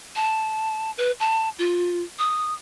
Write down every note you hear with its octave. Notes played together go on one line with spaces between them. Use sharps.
A5
B4
A5
F4
D#6